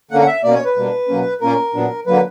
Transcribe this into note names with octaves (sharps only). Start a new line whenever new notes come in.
D3 A#3 C#4 F#5
F#5
E5
B2 A#3 C#4 D5
C#5
B4
B2 G3 A#3 D4
B2 F#3 A#3 C#4
A#2 A#3 C#4 A#4
A#2 F#3 B3 D4
D3 F#3 A#3 B4